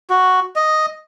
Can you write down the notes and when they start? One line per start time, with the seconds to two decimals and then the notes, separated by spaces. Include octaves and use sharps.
0.10 F#4
0.56 D#5